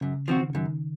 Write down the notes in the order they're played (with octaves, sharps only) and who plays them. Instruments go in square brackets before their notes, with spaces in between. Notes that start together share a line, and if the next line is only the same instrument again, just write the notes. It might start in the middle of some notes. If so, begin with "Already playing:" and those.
[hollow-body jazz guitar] F#2 [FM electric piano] C#3
[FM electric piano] D#3 [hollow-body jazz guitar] F3 C4 F#4
[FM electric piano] C#3
[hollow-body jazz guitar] F#2 [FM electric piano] D#3